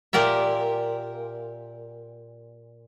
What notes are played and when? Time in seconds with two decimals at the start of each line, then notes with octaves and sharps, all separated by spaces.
0.13 A#2 G4 A#4 D5 E5